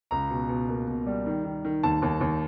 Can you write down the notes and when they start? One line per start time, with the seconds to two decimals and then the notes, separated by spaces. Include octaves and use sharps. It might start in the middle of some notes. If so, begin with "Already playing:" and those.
0.11 C#2 A#5
0.30 B2
0.49 B2
0.69 A#3
0.88 B2
1.06 G3
1.26 D#3
1.44 D#3
1.65 D#3
1.83 D#2 A5
2.02 D#2
2.21 D#2